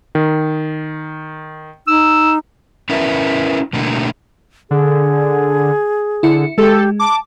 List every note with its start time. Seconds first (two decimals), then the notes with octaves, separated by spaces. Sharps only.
0.15 D#3
1.87 D#4 E6
2.90 C#4 E4 A#4 B4 D5 E5
3.73 B2 D3 A3 A#3 D4 G4
4.71 D3 G#4
6.23 D3 E4 C#7
6.58 G#3 G4 A4
7.00 A5 D6